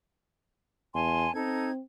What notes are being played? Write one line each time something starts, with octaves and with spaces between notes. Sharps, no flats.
E2 G#5 A5 C6
C4 D#4 A4 G#6